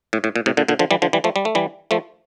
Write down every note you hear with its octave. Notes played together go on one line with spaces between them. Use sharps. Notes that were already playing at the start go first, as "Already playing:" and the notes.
A2
A2
A#2
A2 C3
A#2 D3
A#2 D3
D3 F3
E3 G3
D3 F3
E3 G3
F3 A3
G3
A3
E3 G3
F3 A3